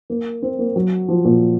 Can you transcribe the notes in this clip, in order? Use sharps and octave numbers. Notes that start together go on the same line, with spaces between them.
A#3
C4
A#3
F#3
F3
A#2